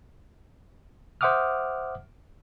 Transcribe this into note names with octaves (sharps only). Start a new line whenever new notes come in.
C5 E5 F#5 D6 D#6 F6